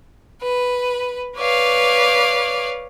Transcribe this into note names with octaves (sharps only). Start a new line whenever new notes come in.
B4
B4 C#5 D5 F5